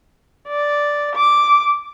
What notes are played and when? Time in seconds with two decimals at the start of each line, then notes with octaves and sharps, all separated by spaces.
0.48 D5
1.15 D6